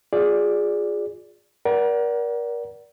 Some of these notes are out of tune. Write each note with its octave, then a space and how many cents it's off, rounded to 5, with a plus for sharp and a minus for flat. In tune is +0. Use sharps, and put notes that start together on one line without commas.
F4 +35 G#4 +0 D5 +0
A#4 +35 D5 -15 F#5 +20